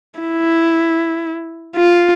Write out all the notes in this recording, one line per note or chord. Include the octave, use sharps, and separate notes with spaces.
E4
F4